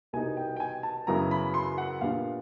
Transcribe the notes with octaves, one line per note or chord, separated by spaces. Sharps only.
C2 B2 G3 B3 D#4 G#5
G5
G5
G#5
A5
F#2 C#3 F#3 B3 E4 A#5
B5
C6
F#5
A#2 G3 B3 D4 F4 F5